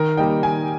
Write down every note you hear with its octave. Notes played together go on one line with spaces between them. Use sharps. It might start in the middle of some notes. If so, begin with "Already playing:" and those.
Already playing: D#3 A#4
G3 A#3 D#4 G5
D#3 G#5